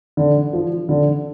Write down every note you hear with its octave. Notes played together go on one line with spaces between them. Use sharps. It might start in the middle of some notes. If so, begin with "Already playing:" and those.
D3
F3
D3